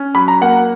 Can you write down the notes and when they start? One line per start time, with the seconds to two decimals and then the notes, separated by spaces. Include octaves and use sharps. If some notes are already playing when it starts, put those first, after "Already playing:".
Already playing: C#4
0.15 F#3 B5
0.28 A#5
0.41 A#3 F#5